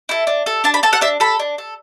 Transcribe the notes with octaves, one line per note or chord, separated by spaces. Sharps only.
E4 A4
D4
A4
D4 A5
B5
A4 A5
F#5
D4 E5
A4 B5
D4
A4